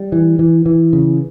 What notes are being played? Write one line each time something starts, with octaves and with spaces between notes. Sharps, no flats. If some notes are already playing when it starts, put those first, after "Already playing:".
Already playing: G3
E3
E3
E3
C#3